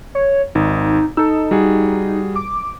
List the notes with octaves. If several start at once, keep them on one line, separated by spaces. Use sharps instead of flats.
C#5
G#1 D#4
D#4 A4 E6
G3 F#4 G#4
D6